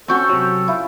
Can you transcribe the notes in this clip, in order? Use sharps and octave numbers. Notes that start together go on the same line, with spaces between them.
C4 C#4 F#4 A4 G5 C#6
C3 F#3
E4 F4